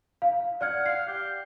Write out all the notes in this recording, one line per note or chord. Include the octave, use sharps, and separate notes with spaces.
F5
D5 F#5 F6 G#6
F5 C7
G4